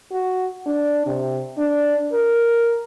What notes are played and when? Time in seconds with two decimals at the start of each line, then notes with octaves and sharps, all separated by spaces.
0.12 F#4
0.66 D4
1.06 C3
1.57 D4
2.13 A#4